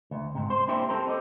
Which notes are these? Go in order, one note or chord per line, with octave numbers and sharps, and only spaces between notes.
D2
G#2 C3
C5
A#3 C4 D4 E4 G4 C5
C4 G4 A4 A#4 C5
G4 A4 C5 D#5